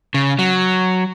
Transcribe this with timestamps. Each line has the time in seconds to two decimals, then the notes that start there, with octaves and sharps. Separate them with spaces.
0.14 C#3
0.39 F#3